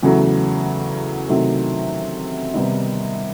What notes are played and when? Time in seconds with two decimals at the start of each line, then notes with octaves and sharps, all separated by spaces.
0.03 E2 C#3 F#3 A3
1.28 C3 D#3 F#3 A3
2.54 C3 D#3 G3 B3 D#4